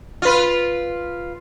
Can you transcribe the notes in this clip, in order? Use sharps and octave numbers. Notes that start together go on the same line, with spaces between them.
F4 B4